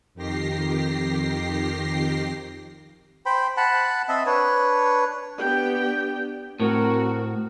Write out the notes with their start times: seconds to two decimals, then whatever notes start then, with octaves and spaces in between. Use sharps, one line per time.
0.14 F2 D#3 G4 A#6 C7
3.26 C5 G5 B5
3.57 F#5 A5 B5
4.09 C4 D#5 E5 A5
4.26 D4 B4 C#5
5.39 B3 D4 G4 G5
6.60 A2 C4 F#4 A#4